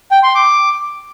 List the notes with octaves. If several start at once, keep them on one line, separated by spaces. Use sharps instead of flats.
G5
C6
D6